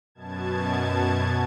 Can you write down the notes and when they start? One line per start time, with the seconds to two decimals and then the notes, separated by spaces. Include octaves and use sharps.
0.15 F#2 B2 A5 G#6